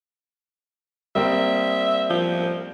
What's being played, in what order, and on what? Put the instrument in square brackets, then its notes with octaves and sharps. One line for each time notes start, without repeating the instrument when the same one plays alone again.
[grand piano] G3 A#3 C4 [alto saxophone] E5
[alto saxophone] F3